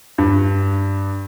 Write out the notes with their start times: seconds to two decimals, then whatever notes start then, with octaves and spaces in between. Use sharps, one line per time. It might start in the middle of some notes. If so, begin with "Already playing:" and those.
0.18 G2